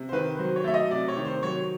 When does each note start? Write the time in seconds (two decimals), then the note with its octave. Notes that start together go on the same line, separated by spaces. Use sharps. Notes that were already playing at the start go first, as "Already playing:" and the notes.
Already playing: C3
0.09 C5
0.12 D#3 B4
0.39 F#3 C5
0.56 C#5
0.64 A3 E5
0.74 D#5
0.91 C3 D5
1.08 C#5
1.16 D#3
1.25 C5
1.43 F#3 C#5